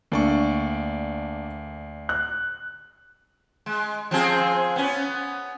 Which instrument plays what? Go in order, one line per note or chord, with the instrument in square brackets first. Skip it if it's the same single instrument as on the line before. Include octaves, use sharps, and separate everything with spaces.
[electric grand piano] D2 D5 C#6 [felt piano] A#3 D4
[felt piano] F#6
[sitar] G#3
F3 C4 G#4
B3 C#4